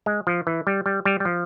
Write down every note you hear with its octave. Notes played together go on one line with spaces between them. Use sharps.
G#3
F3
E3
G3
G3
G3
G3
F3